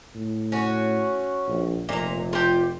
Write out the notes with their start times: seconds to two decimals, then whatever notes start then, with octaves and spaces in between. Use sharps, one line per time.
0.15 A2
0.52 C#4 F#4
1.48 A#1
1.89 F1 A#2 A#5
2.33 F4 G4